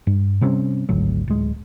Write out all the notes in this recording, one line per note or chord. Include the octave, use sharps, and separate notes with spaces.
G2
C3 G3 C4 C#4
G#1 D2 F#3
D1 G#3